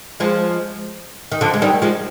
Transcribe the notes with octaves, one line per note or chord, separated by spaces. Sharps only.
F3 G#3
D#3
D3 F3
G#3
D#3 G3
F3 G#3